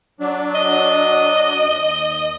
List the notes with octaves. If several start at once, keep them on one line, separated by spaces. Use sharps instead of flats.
F#3 D4
D#5
D#2